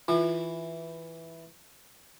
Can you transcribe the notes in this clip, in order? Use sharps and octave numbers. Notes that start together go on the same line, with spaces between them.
E3 F4